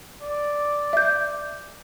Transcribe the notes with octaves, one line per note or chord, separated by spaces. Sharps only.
D5
E5 G6